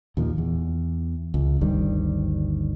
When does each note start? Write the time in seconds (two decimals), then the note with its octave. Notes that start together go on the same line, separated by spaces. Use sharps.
0.17 D#2 A#2 E3 F3
0.38 E2
1.34 C#2
1.61 G1 D2 D#3 G3